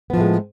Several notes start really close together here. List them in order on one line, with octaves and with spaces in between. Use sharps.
B3 F3 A2 G#3